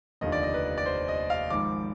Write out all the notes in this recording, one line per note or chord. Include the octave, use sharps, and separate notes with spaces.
F1 D#2 D3 F3 D#5
D5
D#5
B4
D5
C5
D#5
F5
G#1 G#2 F3 D6